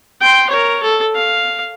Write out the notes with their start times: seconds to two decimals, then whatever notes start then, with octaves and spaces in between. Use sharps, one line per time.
0.20 G5 C6
0.49 A#4 C#5
0.82 A4
1.15 F5